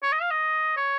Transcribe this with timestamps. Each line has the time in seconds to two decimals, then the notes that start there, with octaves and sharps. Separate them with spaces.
0.03 C#5
0.12 D#5
0.22 F5
0.31 D#5
0.77 C#5